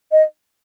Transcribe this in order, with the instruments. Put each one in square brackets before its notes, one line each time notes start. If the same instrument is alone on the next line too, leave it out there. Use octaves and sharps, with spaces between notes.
[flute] D#5